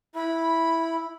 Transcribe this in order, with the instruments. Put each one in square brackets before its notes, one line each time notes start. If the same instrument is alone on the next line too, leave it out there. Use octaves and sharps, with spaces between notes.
[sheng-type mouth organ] E4 [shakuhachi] B5